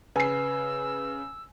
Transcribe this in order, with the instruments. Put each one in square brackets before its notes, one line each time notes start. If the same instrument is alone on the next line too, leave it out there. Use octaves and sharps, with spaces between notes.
[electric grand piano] C#3 [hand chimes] B4 [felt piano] G#5 C7 [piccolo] E6